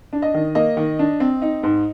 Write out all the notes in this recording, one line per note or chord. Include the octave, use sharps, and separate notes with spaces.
D4
D#5
D#3
A#3 D#5
D#3
D4
C4
D#4
G#2